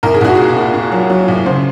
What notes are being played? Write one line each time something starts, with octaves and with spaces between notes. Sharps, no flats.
C2 A#4
G#4
C2 F#4
A#2 G#4
A#2
A#2
F#3
F#3
C2
C#3 C5